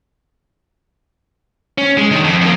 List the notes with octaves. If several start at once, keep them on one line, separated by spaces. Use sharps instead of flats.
C#4
G#3
D3 D#3
F2
F2 A#3